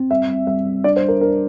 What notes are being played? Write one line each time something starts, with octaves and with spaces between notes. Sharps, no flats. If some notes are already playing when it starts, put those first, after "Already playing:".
Already playing: C4
G3 E5
G3
G3 E5
G3
D4 D5
C5
G3
A#4
D4 A#4